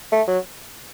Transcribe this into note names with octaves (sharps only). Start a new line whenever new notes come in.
A3
F#3